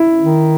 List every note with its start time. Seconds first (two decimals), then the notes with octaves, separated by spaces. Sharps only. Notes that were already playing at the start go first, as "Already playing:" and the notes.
Already playing: E4
0.21 D#3